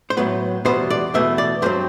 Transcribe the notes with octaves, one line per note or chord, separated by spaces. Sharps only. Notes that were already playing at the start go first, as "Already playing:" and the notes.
C5
A2 F#3 B3 B4
E2 B2 G3 B3 C5
D5
E2 B2 A3 E5
D5
G2 F#3 C4 C5